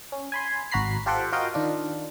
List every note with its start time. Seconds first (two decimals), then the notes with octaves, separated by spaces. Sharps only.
0.12 C#4
0.32 G#5 B5 C6
0.71 G#1 F#4 A#5 B5 C7
1.06 F4 G4 A4 C5 F#5 G5
1.32 F4 F#4 A#4 D#5 F5 G5
1.54 D#3 D4 F4